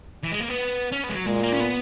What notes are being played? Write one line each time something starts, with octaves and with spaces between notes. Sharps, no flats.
E3
G#3
A#3
B3
C#4
B3
G#3
F#3
A#2 G#3
A#3
C#4
B3